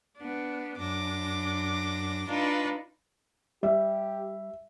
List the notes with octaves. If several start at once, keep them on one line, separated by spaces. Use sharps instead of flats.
B3 D4
F#2 D4 D6 A#6
D4 D#4 F4 B4
G3 G4 E5